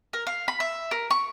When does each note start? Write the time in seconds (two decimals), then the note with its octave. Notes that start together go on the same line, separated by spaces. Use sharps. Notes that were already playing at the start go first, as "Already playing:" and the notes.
0.13 A#4
0.27 F5
0.48 B5
0.60 E5
0.91 A#4
1.10 C#6